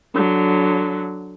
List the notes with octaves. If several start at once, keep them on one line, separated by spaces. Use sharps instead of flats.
D3 F#3